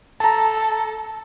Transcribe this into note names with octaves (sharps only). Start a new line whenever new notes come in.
A4 A5 A#5